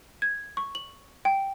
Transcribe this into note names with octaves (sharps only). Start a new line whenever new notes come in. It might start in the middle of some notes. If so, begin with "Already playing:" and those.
G#6
C#6
F#7
G5